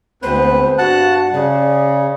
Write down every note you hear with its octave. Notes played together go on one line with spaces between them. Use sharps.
D2 G#3 B3 C4 B4 C5
G2 F#4 F#5 A5 F#6
C#3 G#4 D5